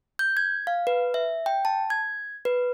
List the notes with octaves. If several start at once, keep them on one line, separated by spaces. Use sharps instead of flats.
G6
G#6
F5
B4
E5
G5
A5
G#6
B4